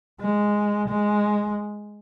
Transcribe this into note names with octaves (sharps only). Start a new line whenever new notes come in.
G#3
G#3